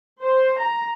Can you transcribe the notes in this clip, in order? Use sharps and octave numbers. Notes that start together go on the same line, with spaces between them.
C5
A#5